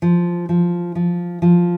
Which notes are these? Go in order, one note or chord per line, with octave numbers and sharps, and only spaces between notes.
F3
F3
F3
F3